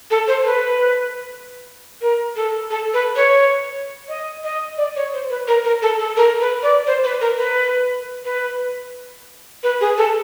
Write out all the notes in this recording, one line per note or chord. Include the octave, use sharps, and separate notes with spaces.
A4
C5
B4
A#4
A4
A4
B4
C#5
D#5
D#5
D5
C#5
C5
B4
A#4
A#4
A4
A4
A#4
B4
D5
C5
B4
A#4
B4
B4
B4
G#4
A4